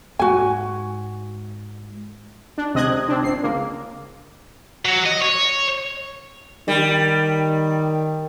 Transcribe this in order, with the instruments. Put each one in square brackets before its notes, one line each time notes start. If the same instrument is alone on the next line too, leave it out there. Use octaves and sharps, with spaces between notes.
[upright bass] G#2 [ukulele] F#4 G#5
[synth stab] D4
C#2 C3 D#5 D#6 F#6 G#6
C4 D4
G1 C7
C#2 A#3
[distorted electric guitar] F#3
D#5
C#5
[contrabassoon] D#3 [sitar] G3